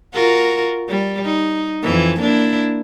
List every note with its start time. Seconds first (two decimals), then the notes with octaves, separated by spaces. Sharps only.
0.14 F4 F#4 A#4
0.89 G3
1.25 D#4
1.83 F2 E3
2.20 A#3 D4 E4